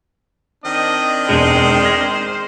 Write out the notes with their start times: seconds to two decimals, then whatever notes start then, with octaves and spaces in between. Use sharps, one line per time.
0.64 D#3 C4 D4 D#5
1.29 E1 E2 G#3 C5
1.83 F6 G#6 A#6